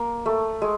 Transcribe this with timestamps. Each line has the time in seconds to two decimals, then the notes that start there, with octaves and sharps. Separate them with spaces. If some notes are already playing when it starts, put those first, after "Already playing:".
Already playing: A#3
0.26 A3
0.62 G#3